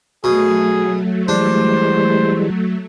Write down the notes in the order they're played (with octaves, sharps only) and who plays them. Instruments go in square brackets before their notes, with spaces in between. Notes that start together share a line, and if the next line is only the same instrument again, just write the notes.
[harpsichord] B2 [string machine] F#3 A3 [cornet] G#4
[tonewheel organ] E3 G3 G#3 [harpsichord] D4 [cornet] C5